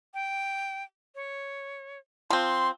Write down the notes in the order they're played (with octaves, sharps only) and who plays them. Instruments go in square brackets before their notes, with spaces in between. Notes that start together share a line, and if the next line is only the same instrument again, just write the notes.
[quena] G5
C#5
[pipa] F3 C4 [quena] C6